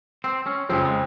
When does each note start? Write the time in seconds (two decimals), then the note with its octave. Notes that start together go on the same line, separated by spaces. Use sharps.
0.24 C4
0.46 C#4
0.69 F2 C#3 F3 C4
0.85 G#3